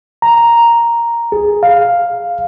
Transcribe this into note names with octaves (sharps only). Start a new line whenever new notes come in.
A#5
G#4
F5